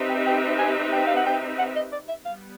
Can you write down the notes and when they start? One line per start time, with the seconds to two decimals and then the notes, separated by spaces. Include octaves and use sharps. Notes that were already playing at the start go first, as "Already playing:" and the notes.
Already playing: C4 D#4 G4 B4 E5
0.09 G5
0.27 G5
0.59 G#5
0.93 G5
1.07 F5
1.16 F#5
1.26 G5
1.58 F#5
1.76 D#5
1.92 D5
2.09 E5
2.25 G3 B3 F5